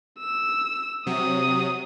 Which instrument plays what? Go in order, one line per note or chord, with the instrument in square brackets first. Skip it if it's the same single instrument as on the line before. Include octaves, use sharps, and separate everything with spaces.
[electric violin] E6
[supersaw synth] C3 F#3 [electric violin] D#6